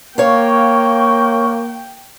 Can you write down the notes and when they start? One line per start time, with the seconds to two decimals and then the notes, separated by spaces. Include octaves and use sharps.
0.18 A#3 C#5 F5 G5 C#6